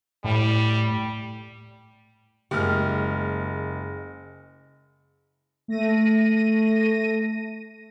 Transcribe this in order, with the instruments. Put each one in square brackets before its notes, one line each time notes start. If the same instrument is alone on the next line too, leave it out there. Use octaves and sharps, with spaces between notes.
[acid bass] A2 [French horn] G3
[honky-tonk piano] F#1 F6 [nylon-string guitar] G#3 A#3 G4
[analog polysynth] A3 A#6 D#7